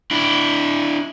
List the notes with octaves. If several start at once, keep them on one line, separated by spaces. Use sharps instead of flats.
D4 E4